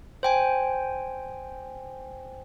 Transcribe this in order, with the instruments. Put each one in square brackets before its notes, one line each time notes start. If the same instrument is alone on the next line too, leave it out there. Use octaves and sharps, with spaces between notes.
[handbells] C5 G5 G#5